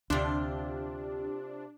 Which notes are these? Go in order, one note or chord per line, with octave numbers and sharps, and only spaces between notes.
D2 C3 D4 F4